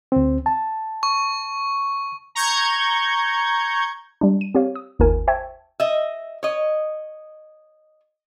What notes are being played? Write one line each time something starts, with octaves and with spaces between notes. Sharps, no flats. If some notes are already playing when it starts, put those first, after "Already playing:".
D2 C4
A5
C#6
A#5 C#6 G6 G#6
G3 D4
D#7
C4 G4 C#5 F5
D#6
G1 D#2 D#4 F4 A#4 G#5
C5 E5 G5 A5 C#6 G#6
D#5 E5
C#5 D#5